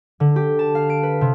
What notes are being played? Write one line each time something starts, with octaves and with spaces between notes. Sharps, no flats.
D3
G4
A5
F5
D7
B4
C3